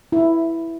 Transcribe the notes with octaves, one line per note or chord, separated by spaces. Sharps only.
E4